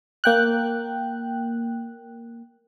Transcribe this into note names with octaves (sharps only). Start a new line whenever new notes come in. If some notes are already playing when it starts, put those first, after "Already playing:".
A#3 G5 F#6